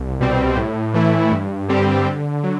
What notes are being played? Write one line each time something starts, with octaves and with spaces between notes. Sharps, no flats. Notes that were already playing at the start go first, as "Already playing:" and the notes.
Already playing: C2
B2 G3 C4
A2
E3 A3 E4
G2
D3 G3 C4 G4
D3
F#3